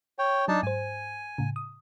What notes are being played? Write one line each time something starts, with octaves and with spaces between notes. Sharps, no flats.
C#5 G5
F#3 D4 D#4 A5
G#2 C5 G#5
A2 C#3
D#6